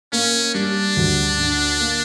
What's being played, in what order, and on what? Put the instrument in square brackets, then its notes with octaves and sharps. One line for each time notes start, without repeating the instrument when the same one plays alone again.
[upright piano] A#3 [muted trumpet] C#4
[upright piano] G3 [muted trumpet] D4
[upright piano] D2
D3
A#3